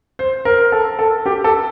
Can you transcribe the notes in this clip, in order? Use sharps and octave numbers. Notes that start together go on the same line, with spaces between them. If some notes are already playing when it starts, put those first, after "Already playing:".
C5
A#4
A4
A4
G4
A4